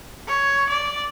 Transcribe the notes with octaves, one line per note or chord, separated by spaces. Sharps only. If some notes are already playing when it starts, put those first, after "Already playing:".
C#5
D5